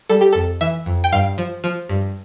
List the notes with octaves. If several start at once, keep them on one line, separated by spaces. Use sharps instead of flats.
G3 A4
G4
F2 A4
E3 E5
F2
G5
G2 F5
F3
F3
G2